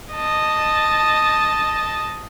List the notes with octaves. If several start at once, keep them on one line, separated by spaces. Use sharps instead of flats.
D#5 A5